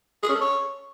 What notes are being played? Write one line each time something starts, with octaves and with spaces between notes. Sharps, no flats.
G#4
C#4
A4
C#5